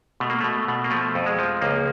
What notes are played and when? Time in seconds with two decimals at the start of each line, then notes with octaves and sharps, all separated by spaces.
0.20 B2 A3
0.30 A#3
0.41 B2 A3
0.68 B2
0.84 A#3
0.91 F3 A3
1.15 F2
1.26 G#3
1.39 F3
1.61 C#2 A#3